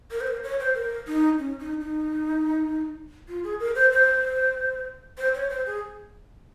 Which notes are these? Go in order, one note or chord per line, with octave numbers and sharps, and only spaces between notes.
A#4
C5
A#4
C#5
C5
A#4
D#4
C#4
D#4
D#4
F4
G#4
A#4
C5
C5
C5
C#5
C5
G#4